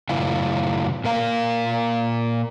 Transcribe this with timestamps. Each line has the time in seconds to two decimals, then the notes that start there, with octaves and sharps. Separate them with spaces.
0.09 F#2 A2 C#3 E4 F4
1.04 A#2 A#4 F5